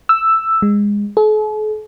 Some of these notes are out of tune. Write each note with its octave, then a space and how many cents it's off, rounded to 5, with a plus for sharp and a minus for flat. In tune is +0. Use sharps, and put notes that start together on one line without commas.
E6 +5
G#3 -20
A4 -45